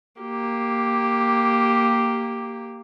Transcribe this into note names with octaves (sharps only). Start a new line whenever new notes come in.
A#3 G4